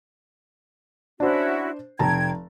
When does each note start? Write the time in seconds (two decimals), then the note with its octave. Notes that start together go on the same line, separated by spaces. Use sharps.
1.20 C#4 D4 E4 F#4 C5
1.99 F1 G5 A5 A#5 G#6